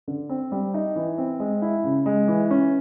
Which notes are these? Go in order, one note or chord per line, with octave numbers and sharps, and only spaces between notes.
D3
C4
G3
D#4
E3
C4
G#3
E4
C#3
G#3
E3
C#4